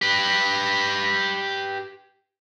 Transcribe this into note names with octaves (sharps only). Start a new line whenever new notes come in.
G4 B4